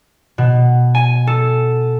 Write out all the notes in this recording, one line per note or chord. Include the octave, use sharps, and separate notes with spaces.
B2
G#5
A4